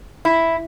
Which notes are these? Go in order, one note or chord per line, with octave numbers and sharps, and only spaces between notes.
E4